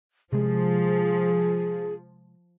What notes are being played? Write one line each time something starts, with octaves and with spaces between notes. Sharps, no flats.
C3 F3 G#3 G#4